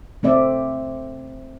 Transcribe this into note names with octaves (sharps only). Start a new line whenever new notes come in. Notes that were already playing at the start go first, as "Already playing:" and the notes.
A3 C4 D5 E5